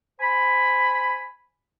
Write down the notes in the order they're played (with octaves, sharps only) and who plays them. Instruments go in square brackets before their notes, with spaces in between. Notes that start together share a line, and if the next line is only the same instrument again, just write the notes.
[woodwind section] C5 G#5 B5